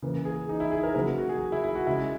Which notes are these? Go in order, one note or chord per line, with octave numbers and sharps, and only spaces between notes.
C#3 E3 A#3
G#4
D#4
E4
G#4
A#4
C#3 F#3 A#3 A#4
F#4
G#4
E4
E4
F#4
C#3 G#3 E4